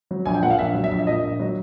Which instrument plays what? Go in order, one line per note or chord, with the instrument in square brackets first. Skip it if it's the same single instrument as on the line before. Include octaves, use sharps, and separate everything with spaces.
[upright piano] F#3
A#1 G#5
G5
A#2 F#5
F5
A#1 E5
F#3
E5
A#1
E5
A#2 D#5
A#1
F#3